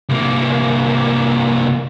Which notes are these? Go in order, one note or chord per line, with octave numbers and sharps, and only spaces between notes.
C2 A#3